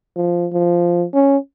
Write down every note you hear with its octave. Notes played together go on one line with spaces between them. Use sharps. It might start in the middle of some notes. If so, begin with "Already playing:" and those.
F3
F3
C#4